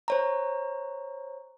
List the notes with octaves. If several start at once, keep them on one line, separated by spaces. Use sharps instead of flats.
C5 C#5 A#5